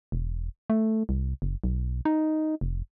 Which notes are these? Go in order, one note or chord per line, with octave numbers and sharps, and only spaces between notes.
E1
A3
C2
F#1
B1
D#4
F1